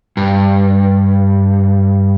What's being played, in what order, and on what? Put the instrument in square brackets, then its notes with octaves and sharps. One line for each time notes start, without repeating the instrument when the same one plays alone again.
[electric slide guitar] G2